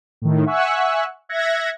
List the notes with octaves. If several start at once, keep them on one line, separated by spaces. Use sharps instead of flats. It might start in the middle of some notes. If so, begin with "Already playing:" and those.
A2 D#3
E5 F#5 G#5 C#6 E6 F#6
E5 F#6 G#6 A#6 C#7